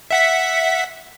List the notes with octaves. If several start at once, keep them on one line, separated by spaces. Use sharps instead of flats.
E5 F#5 B6